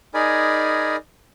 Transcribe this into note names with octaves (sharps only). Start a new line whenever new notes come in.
D#4 G#4 A#4 D5 G#5 B5